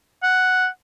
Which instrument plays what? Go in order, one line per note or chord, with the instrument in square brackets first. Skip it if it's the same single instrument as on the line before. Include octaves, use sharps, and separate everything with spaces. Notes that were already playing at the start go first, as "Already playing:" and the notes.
[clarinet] F#5